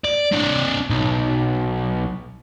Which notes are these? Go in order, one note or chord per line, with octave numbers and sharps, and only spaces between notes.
D5
C4 D4
B1